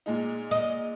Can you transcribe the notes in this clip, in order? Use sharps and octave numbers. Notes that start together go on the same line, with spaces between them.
A#2 G#3 D#4
D#5